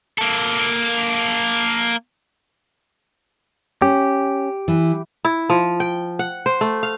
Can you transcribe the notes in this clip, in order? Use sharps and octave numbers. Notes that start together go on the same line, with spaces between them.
A#3 A4
C#4 G4
E3
E4
F3
G5
F#5
C5
A3
F5